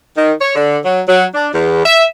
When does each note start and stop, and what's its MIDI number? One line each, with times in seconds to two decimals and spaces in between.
0.16 0.31 51
0.41 0.52 73
0.55 0.77 50
0.85 1.01 54
1.07 1.24 54
1.34 1.48 62
1.53 1.83 40
1.85 2.04 76